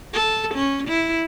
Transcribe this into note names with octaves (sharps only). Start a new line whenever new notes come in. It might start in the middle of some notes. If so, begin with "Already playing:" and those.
A4
C#4
E4